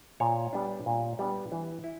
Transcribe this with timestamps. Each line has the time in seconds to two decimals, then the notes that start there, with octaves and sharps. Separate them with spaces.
0.20 A#2 C#5
0.53 G3 B3 D4
0.86 A#2
1.19 G3 B3 D4
1.52 E3
1.84 E4